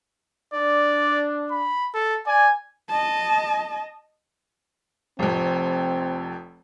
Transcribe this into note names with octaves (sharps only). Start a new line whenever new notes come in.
D4 D5
B5
A4
D5 G#5
D#5 A5
F1 F2 C4